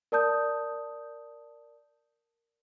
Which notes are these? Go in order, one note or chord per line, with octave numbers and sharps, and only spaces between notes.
A#4 D5 A5 D#6 G6